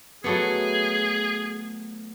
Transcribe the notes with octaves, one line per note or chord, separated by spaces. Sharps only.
F#3 A3 B3 G#4